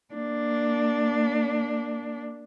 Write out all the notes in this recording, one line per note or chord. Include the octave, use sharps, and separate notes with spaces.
A#3 D4